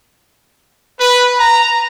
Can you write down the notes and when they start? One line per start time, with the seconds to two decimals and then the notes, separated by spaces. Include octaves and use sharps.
1.00 B4
1.38 A#5